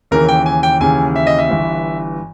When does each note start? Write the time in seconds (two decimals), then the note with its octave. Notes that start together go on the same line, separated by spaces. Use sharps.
0.11 D#2 C#3 E3 A#4
0.28 G5
0.46 G#5
0.63 G5
0.80 D#2 C#3 E3 G#5
1.16 E5
1.27 D#5
1.38 E5
1.49 G1 G2 E3